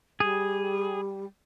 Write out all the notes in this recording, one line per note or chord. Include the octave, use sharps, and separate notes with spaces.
G3 G#4